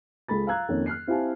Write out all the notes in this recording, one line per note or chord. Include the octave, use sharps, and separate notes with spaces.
C#2 G#3 A4 B5 A6
F5 A#5 E6 F#6 G#6
F2 D#3 A#3 C#4
F6 F#6 C7
C4 E4 G4 F5 G#5 A5